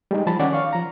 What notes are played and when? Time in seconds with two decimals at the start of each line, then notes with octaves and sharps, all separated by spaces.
0.11 G3 G#3 D#4
0.27 F3 A5 B5
0.39 D#3 C#4 D5 F#5
0.53 F5 C#6
0.73 F3 A#5